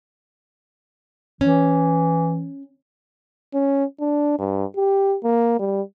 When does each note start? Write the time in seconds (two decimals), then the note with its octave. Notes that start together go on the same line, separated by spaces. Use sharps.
1.41 E3 C#4
3.54 C#4
4.00 D4
4.39 G2
4.76 G4
5.24 A#3
5.59 G3